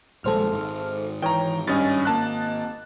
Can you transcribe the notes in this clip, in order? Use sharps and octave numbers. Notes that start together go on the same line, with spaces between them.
D#1 A#1 G#3 A4 C5 F6
G#1
E3 C#5 G5 A#5
G2 C#4 D#5 G#5 A6
A#3 A5 F#6